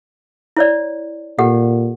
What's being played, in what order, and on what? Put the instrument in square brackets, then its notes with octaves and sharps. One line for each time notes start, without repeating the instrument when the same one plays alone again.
[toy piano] E4 C#5 D5
[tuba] A#2 [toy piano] G4 A4 F#5